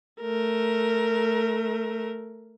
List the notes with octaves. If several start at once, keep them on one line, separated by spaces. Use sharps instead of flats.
A3 A#4